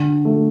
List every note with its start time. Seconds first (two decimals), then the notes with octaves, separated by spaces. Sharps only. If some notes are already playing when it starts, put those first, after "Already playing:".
Already playing: D3
0.25 A3